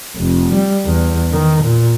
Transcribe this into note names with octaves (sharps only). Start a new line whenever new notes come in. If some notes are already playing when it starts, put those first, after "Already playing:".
F1
G3
E2
D#3
A#2